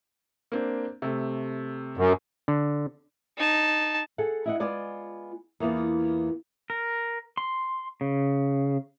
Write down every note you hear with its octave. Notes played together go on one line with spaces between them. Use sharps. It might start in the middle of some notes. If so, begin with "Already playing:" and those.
A#3 C4 D4
C3 A3
F#2
D3
D#4 A5
G#4 A4 F#5
E4 D#5 F#5
G#3 B3 F4 D5 G#5
E2 A#3 B3 F4
A#4
C6
C#3